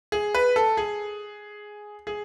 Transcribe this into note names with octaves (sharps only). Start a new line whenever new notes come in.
G#4
B4
A4
G#4
G#4